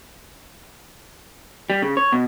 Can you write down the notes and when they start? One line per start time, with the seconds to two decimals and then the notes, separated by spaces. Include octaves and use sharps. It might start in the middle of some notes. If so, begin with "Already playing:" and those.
1.70 G3
1.82 C#3
1.97 C#5
2.12 B2